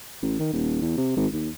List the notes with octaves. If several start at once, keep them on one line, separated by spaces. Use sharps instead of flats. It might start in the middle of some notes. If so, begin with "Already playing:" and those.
A1
D#3
D#1
E2
C3
G#1
D#2